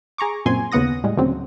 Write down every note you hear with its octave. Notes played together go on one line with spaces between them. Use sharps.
G#4 A#5 C#6 D6
F#2 A#2 C4 G#5 C6
D#2 C#3 B3 F#5 D#6 A#6
A2 G3 G#3
D2 A#2 C#3 F#3 C4